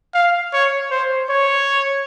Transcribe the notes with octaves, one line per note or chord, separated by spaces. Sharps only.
F5
C#5
C5
C#5